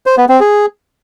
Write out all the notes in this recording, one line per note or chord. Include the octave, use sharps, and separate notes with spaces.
C5
B3
C4
G#4